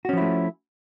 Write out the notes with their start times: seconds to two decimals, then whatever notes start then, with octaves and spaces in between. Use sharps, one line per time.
0.05 F#4
0.09 C#4
0.13 F3
0.17 E4
0.21 A3